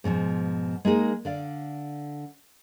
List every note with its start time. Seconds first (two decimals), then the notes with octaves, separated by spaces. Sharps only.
0.04 G#2 B2 E3 F3
0.85 G#3 A#3 D#4 G#4
1.25 D3 D5 F5